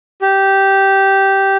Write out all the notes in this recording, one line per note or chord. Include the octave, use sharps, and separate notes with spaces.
G4